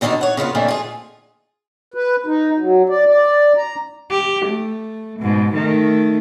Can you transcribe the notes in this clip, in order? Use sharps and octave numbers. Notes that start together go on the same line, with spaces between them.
B2 D3 D#3 C4 D4 D#4
C#5 F#5
C#3 A#3 B3 F4
F2 A#2 D3 D#3 A3
F4 G#4
B4
D#4
F#3
D5
D5
A#5
G4
A3
G#2 B2
D#3 A3